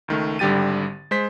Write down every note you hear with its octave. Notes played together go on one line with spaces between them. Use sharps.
C#2 D#3 A3
G#1 D3 G3 G4 A6 D#7
G#3 C5 B6